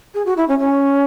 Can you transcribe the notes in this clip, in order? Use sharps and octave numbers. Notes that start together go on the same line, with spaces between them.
G#4
F#4
E4
C#4
C#4